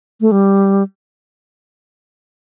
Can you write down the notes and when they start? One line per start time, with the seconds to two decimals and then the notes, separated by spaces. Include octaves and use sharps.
0.21 A3
0.32 G3